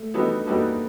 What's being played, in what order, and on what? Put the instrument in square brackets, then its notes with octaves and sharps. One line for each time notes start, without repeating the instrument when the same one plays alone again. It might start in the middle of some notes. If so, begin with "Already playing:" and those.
Already playing: [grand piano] A3
[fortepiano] G3 B3 D#4 F#4 A4
[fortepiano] G3 B3 D#4 F#4 A4 [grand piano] A#3